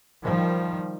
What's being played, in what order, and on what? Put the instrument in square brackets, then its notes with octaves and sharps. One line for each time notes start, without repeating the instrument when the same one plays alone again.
[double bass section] D#3 F3 G3